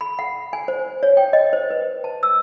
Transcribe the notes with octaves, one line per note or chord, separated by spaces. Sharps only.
B5
F#5
G#5
C5
C#5
G5
D#5
C5
B4
A5
E6